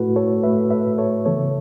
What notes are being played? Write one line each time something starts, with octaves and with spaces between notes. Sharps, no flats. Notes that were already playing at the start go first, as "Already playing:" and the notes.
Already playing: A2 A3 E4 F#4 A4 B4
A4 C#5
A2 A3 B4 E5
B4 E5
A4 C#5
C#3 E3 B3 A4 C#5